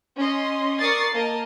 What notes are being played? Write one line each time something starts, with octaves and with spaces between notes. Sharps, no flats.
C#4 D#5 C6
A#4 D5 C#6 D#6 A6 C7
A#3 A#4 D#5 A5